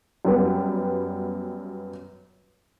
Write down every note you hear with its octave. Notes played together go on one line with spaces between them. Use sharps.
F#2 G3 B3